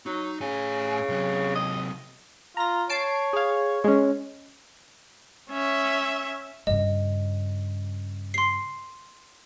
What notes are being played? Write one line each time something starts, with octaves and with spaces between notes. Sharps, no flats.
F#3 D#4
A2 C#3 G#5
C3 F#3
D#5
F4 A#5 A#6
C#5 A5 C7 D7
G#4 F5
G#3 C#4
C#4 E5
G2 C#3 D#5
C6 C7